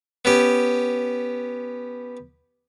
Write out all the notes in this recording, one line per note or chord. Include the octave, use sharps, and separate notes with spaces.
B3 C#4 G4